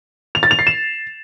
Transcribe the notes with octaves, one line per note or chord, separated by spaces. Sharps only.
F7
A6
F7
C7
E7